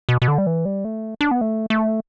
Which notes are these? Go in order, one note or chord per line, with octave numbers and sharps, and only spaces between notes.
B2
B2
D3
G3
E3
G3
A3
D4
B3
A3
A3